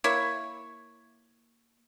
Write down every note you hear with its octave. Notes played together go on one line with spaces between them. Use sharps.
A#3 E4 C#5